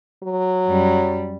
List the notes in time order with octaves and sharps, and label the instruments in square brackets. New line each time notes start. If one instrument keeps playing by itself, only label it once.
[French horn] F#3
[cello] F#2 G3